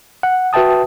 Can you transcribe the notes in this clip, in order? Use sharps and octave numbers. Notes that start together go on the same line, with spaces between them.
F#5
F#4 B4 E5 G5 A5 D#6